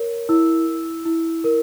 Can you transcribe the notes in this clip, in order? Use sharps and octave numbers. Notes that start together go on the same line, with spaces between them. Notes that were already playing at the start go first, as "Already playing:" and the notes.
Already playing: A#4 C#5
E4 E6
E4
E4
A#4